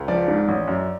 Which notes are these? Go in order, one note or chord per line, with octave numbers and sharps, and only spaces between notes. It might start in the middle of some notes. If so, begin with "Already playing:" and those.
Already playing: C#2
F3 D5
G#2
A1
F#2